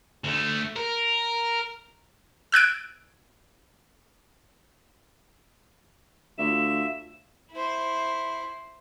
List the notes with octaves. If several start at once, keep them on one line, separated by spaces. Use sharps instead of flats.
D2 A3
A#4
E6 F#6 G#6 D7
D2 F4 E5 E7
E4 C5